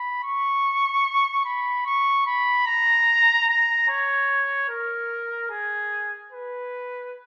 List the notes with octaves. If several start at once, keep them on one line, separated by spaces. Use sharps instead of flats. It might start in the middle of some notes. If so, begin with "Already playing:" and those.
Already playing: B5
C#6
B5
C#6
B5
A#5
A#5
C#5
A#4
G#4
B4